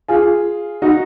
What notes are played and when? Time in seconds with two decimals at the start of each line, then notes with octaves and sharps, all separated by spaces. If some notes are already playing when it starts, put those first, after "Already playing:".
0.08 F4 G#4
0.82 D#4 F#4